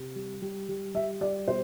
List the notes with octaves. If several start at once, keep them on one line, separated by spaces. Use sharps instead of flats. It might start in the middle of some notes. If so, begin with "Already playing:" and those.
Already playing: C3
G3
G3
G3
G3 E5
G3 D5
B2 C5